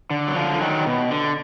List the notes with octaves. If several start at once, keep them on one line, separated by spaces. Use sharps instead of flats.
D3
F#3
D3 F3
F3
D#3 F#3
B2
D3